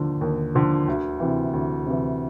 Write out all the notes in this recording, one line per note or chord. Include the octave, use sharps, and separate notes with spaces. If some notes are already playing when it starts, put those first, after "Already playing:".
Already playing: D#2 D3 F3
D#2
D3 F3
D2
C3 E3
D2
C3 E3